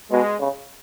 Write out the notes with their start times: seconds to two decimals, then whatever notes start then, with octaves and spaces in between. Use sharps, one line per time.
0.11 B2 G#3
0.40 C#3